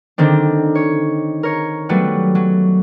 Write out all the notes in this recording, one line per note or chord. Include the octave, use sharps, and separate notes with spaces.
D3 D#3 C4 D4
C#5
A#4 C#5
F#3 G3 A3 B3 F#4
F#3